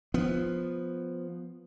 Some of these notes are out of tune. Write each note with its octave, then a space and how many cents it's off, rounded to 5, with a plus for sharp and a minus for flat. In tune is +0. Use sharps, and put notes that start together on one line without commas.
F3 +5 B3 +5